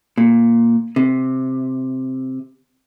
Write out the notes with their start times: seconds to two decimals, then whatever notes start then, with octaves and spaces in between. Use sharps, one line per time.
0.18 A#2
0.96 C3